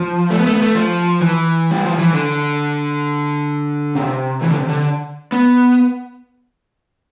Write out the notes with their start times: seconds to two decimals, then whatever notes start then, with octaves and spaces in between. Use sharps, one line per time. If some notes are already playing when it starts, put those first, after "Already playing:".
Already playing: F3
0.30 A3
0.38 B3
0.46 A3
0.55 B3
0.62 A3
0.75 F3
1.22 E3
1.71 G3
1.86 F3
1.98 E3
2.13 D3
3.95 C3
4.41 E3
4.50 D3
4.60 C3
4.69 D3
5.32 B3